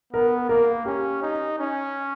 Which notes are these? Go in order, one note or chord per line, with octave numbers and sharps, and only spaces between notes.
B3 A#4
A#3 A#4
C#4 G4
D#4
C#4